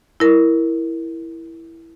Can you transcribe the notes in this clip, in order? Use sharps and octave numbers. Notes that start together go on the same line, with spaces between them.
E4 A#4